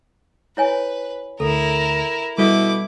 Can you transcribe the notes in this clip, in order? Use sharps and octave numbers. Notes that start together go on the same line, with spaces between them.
E4 B4 C#5 G#5
D2 E4 A4 A#4
B2 G3 E4 A4 D6